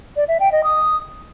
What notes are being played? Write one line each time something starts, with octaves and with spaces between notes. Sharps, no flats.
D5
E5
G5
D#5
D#6